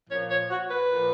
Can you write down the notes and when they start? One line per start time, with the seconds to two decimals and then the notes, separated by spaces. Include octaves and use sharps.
0.09 A#2 F3 C#5
0.30 C#5
0.50 F#4
0.70 B4
0.89 A#2 F3